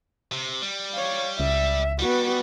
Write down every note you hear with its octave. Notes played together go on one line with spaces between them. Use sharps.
C3
G3
C#5 F5
C#2 E5
G3 B3 F#4